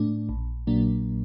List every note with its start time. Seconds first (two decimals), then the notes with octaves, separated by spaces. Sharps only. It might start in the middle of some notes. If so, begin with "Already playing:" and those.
Already playing: A2 A3 D4
0.29 A#1
0.67 A#2 F#3 A#3 D4